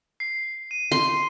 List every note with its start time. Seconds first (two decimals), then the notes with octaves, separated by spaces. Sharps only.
0.20 C7
0.71 D#7
0.92 C6